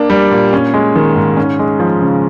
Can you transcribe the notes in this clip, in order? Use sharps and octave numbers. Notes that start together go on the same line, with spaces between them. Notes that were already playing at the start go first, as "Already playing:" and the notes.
Already playing: A#3 D4
G3
A#2
C#4
G#3
D#3
G#2
C#4
G#3
F3
C#3